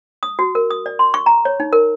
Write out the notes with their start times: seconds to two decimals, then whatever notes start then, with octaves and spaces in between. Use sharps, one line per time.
0.23 D#6
0.39 F#4
0.55 A#4
0.71 D#6
0.86 D5
0.99 C6
1.14 C#6
1.26 A#5
1.45 C#5
1.60 D#4
1.73 A#4